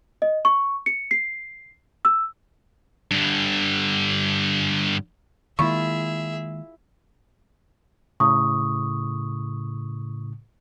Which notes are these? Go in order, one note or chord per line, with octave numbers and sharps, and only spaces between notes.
D#5
C#6
C#7
C7
E6
G2 D3
D#3 G#3 A#3 E4 F4 G#4 E5 C#6
A2 C#3 C#6 D#6